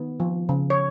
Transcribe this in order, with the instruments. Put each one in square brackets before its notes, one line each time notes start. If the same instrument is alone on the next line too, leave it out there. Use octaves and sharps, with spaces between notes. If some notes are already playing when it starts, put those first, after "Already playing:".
Already playing: [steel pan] D#3 B3
F3
C#3
C#5